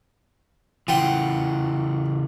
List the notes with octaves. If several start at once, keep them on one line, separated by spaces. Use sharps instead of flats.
C#3 E3 F4 F#5 G5